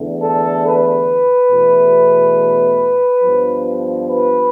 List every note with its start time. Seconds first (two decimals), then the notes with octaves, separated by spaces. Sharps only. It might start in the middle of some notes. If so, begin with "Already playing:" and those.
Already playing: E2 D3 A3
0.21 A4
0.64 B4
1.51 E2 B2 A3
3.24 G2 F3 B3
4.10 B4